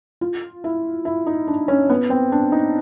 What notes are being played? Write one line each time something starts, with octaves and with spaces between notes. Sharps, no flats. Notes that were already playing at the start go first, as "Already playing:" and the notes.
F4
E4
E4
D#4
D4
C#4
B3
C4
D4
D#4